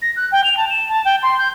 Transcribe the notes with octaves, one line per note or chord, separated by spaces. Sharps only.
A#6
F#6
G5
F7
A5
E7
A5
G5
C6
G6